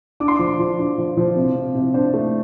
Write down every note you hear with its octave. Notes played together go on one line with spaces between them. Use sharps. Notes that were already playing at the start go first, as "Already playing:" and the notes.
D4 D6
C6
F3 D6
F3
D4
F3
F3
C3
C3
C3
D4 C5
A3